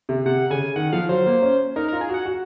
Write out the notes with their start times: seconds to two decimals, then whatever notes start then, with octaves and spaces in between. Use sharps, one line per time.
0.09 C3
0.26 C3 F#5
0.50 C#3 G#5
0.76 D#3 F#5
0.92 F3 F5
1.09 F#3 C5
1.26 A#3
1.42 C#4
1.76 D#4 A#4
1.88 A#4
1.93 F4
2.01 G#4
2.09 F#4 F#5
2.26 F#4